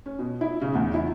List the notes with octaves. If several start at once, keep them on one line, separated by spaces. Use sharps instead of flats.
C#4
B2
E4
C#3
E2
E4